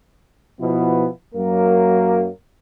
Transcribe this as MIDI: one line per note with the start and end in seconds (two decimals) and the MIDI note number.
0.60 1.07 47
0.60 1.07 53
0.60 1.07 59
0.60 1.07 64
1.34 2.28 42
1.34 2.28 54
1.34 2.28 58
1.34 2.28 70